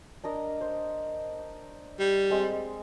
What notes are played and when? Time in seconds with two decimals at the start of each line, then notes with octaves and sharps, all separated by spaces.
0.24 D4 A#4 D#5
0.61 C5
2.00 G3
2.30 G#3 C4